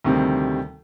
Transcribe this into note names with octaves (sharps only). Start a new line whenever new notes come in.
D2 C3 D#3 G3 C4